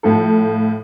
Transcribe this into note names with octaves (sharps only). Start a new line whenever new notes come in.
A2 F3 A4